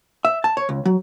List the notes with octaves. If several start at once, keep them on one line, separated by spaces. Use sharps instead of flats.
E5
A5
C#5
C#2
F#3